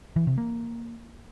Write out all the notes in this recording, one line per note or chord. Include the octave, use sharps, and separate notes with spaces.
E3
C3
A#3